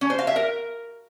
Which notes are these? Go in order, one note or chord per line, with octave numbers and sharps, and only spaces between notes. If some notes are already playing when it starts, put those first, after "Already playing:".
C#4
C5
F5
E5
A#4